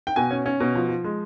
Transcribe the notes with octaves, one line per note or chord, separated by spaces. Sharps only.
G5
B2 G#5
C#4
C#4
B2
F3
F3
G#3